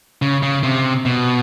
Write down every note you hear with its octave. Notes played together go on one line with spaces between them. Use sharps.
C#3
C#3
C3
B2